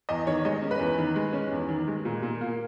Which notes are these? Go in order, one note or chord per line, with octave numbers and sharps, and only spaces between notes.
E2 D#5
D#3 C#5
G#3 D#5
C#4
B4
E2
D#3
G#3
C#4
E2
D#3
G#3
A#2
A#2
A#3